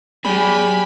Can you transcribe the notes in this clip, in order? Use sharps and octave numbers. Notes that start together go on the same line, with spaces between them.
F#3 G4 G#4 D5 G#5 B5